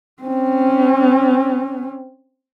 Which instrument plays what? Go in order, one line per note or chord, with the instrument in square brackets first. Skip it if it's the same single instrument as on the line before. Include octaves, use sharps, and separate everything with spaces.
[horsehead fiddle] C4 C#4